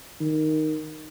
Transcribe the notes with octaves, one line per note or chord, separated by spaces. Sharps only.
D#3